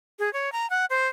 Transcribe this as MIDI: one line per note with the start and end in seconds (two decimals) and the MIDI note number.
0.19 0.32 68
0.33 0.52 73
0.52 0.69 82
0.70 0.85 78
0.90 1.08 72